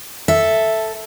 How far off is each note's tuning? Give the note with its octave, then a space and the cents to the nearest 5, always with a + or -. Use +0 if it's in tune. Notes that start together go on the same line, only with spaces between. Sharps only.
A4 +0 E5 +0